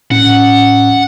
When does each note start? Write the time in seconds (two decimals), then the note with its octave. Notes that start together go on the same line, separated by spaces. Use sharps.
0.11 A2 C#4 F#5